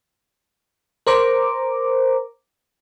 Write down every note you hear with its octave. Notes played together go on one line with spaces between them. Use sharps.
A#4 C5 A#5 D6